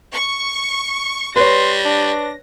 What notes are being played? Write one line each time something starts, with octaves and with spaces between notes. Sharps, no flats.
C#6
G3 B4 C#5 C6 A#6
D4